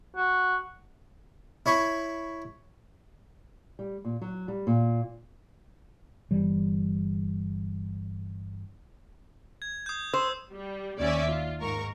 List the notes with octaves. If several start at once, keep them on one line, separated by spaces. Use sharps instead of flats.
F#4
E4 C#5 B5 C#6
G3
A#2
F#3
G3
A#2
G1 E3 G3
G#6
D#6 G6
C5 E6
G3
D#2 C#4 D5 E5
F4
G#2 A#4 C#6